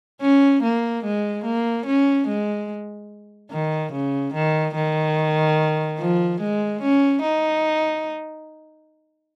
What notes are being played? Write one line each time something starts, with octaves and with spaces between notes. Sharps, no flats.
C#4
A#3
G#3
A#3
C#4
G#3
D#3
C#3
D#3
D#3
F3
G#3
C#4
D#4